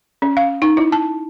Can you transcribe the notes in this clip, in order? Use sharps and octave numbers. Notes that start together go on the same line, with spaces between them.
C#4
F5
D#4
E4
A5